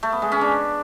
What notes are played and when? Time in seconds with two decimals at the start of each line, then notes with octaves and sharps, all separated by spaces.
0.03 A3
0.12 B3
0.22 G#3
0.32 C#4
0.41 D4